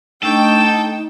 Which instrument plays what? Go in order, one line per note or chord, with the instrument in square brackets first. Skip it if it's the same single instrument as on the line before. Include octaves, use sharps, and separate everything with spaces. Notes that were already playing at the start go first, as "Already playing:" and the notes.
[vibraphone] A3 D4 C#6 [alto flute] D#4 [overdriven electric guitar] A4 [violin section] G5